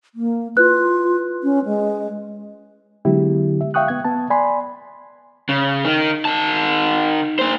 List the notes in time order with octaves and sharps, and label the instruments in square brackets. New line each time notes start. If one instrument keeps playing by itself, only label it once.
[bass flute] A#3
[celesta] E4 B4 F#6 [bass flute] F4
[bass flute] C#4
G#3
[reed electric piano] D3 F#3 G#3 B3 E4 G4
E5
E5 F5 G5 C#6 D#6 F#6
B3 G#6
B3 A5
D5 G#5 B5 C6
[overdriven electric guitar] C#3
D#3
D#3 A5
A#3 C5